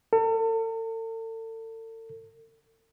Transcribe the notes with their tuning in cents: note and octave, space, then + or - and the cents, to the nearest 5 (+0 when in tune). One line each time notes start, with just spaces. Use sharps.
A4 +40